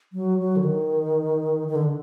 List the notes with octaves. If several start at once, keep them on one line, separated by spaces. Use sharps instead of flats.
F#3
F#3
D3
D#3
D#3
D3